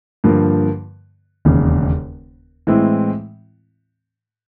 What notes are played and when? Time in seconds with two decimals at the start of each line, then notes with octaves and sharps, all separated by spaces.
0.24 G2 D3 F3 A#3
1.45 E1 D#2 C#3
2.67 A2 E3 G#3 C4 E4